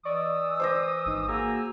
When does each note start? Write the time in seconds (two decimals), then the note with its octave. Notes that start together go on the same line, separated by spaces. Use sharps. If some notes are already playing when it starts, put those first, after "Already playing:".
0.05 E3 D5 D#5 C#6 D#6 E6
0.60 C5 D6 A#6
1.06 G#1 D#4
1.28 A#3 F#4 G#4 G#5 A#5 E6